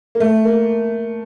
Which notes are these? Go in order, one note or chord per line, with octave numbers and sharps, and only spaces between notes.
A#3
A3
A#3